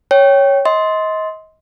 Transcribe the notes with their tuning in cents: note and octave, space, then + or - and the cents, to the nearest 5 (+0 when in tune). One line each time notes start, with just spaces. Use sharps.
C#5 +0 G5 +0
D#5 +30 C6 +0